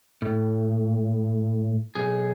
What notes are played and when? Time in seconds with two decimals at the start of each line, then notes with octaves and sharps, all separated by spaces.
0.22 A2
1.95 B1 G#4